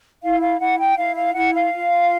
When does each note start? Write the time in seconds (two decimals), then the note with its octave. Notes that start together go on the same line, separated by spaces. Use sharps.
0.23 E4 F5
0.41 F5
0.59 E4 F#5
0.79 G5
0.97 E4 F5
1.16 F5
1.34 E4 F#5
1.53 F5
1.72 F4